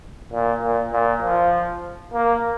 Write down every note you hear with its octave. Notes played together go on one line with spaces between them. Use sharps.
A#2
A#2
A#2
F3
A#3